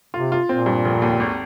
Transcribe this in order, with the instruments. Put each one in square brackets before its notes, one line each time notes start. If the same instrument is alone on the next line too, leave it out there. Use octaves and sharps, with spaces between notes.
[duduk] C3 [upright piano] F4
[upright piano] F4
[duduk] A#2 [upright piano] C4
[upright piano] G2
F1
D#2
G#1